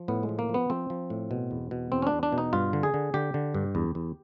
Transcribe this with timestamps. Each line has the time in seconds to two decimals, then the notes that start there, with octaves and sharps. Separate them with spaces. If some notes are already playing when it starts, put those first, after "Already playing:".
Already playing: F3
0.08 A2 B3
0.23 G#3
0.29 F3
0.39 A#3
0.49 F3
0.54 B3
0.70 F3 C4
0.90 F3
1.10 A2
1.31 B2
1.51 E2
1.71 B2
1.92 E2 C4
2.02 C#4
2.07 D4
2.12 E2
2.23 D4
2.32 B2
2.38 D#4
2.53 G2 F4
2.73 D3
2.83 G#4
2.94 D3
3.14 D3 G4
3.34 D3
3.54 G2
3.75 E2
3.95 E2